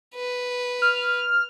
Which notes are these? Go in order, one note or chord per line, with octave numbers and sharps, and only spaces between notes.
B4
F6